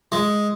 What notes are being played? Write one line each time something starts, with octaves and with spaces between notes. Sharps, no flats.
G#3